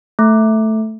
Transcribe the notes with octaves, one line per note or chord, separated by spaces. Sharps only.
A3